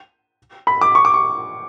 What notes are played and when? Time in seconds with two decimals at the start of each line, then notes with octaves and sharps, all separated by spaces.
0.67 B5
0.81 D6
0.95 C#6
1.05 D6
1.14 C#6